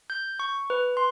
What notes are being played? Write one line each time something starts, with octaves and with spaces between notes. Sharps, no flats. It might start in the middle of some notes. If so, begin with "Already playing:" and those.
G6
C#6
B4
C6